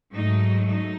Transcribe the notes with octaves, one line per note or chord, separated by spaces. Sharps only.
G#2 F#3 A3 D#4
D#4